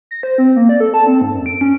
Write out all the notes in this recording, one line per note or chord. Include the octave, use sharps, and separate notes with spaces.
A#6
C5
C4
A#3
D5
A4
A5
C4
G#2
F#2
D7
C#4